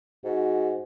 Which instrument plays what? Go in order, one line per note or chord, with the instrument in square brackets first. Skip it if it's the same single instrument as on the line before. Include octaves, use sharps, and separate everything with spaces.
[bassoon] G#2 [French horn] F#4